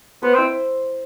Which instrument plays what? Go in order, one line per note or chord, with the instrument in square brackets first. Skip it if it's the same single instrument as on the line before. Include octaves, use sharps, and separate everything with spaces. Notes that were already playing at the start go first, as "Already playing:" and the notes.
[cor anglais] B3 [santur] C5
[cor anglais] C4 [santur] E4